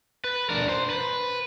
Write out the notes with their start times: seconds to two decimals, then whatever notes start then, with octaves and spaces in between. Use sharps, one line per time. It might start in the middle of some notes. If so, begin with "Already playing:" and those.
0.24 B4
0.49 D4 A#4
0.69 C5
0.90 B4